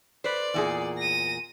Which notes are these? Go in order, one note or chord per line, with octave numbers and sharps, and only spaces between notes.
B4 C5 D5
E2 A#2 G#4
A#6 D#7